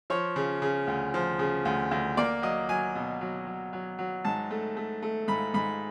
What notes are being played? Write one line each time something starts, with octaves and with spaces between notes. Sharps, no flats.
F3 C#5
C#3
C#3
D2
F3
C#3
D2
D2
A#3 D5
F#3 D#5
F#3 G#5
B2
F#3
F#3
F#3
F#3
G#2 A5
A3
A3
A3
G#2 B5
G#2 B5